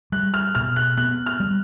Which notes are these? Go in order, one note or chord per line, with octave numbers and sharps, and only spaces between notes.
G3 F#6
F6
B2 F6
F#6
B3 F#6
F6
G3